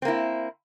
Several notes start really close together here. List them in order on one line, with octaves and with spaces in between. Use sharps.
C4 A#3 E4